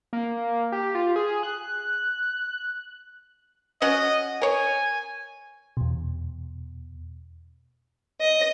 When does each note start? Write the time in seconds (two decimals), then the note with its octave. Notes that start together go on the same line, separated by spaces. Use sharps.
0.13 A#3
0.72 G4
0.95 F4
1.16 G#4
1.43 F#6
3.82 C#4 F#4 D#5 F#5
4.42 A#4 C#5 G#5
5.77 E2 B2
8.20 D#5